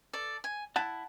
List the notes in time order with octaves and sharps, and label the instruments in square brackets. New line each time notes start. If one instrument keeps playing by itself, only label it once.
[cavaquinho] A4 D5
G#5
[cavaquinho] E4 [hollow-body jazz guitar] F#5 A5